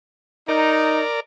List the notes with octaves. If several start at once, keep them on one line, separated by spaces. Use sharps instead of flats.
D#4 A#4 D5